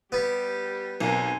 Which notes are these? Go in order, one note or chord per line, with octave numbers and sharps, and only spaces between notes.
G3 B3 G4
B1 C4 A#4 G#5